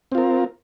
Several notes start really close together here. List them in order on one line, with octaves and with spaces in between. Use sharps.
C4 F4 A#4